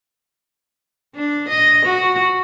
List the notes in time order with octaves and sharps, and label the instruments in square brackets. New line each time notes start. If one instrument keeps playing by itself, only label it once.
[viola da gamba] D4
D#5
F#4